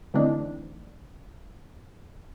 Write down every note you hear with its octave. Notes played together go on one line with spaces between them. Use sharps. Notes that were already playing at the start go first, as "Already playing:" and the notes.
D3 E3 A3 C4 D4 D#4